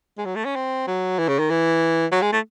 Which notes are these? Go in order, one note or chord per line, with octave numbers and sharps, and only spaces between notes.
G#3
F#3
A3
C#4
C4
F#3
E3
C#3
D#3
E3
F#3
G#3
A3